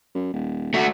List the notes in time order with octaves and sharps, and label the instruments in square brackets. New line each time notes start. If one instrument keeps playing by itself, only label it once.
[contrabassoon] F#2
D#1
[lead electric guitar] A3 F#4